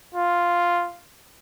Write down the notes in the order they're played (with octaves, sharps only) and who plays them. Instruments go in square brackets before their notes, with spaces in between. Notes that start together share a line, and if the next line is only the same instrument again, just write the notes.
[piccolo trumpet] F4